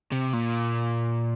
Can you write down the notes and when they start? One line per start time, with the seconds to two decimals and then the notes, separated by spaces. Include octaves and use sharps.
0.12 C3
0.33 A#2